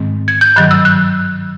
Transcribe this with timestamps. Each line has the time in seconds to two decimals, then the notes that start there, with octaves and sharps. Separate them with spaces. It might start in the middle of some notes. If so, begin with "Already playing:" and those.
Already playing: G#2 D#3 G#3 C4
0.28 G#6
0.41 G6
0.56 G2 D#3 F#3 F#6
0.71 E6
0.85 F#6